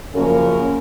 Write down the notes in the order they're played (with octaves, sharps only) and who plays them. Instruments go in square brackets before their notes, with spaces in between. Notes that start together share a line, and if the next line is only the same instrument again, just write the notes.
[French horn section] F#2 C#3 F3 A#3 C#4 A#4